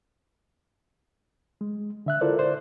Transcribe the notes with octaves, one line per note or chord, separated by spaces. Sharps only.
G#3
D3 E5 F#6
E4 F4 A4 A#4 C5 D5
C5 D5